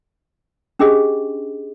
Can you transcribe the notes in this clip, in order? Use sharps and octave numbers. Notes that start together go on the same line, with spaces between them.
C#4 D4 G4 G#4 D#5